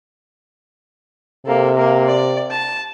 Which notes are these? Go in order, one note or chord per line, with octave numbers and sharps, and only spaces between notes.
C3 A#3 A4
A#3
D5
A5